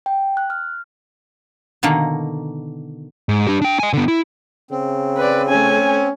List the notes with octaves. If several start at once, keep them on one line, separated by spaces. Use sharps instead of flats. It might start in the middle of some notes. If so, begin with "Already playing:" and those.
G5
F#6
F6
B2 D3 D#3 A#3
G#2
D4 G4
D4 G5
D#5 G#5
D3 B3
E4
C#3 C4
B4 D5
A3 C#4 G#5